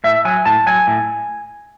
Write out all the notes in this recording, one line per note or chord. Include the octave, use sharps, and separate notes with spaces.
A2 E5
F#3 G#5
A2 A5
F#3 G#5
A2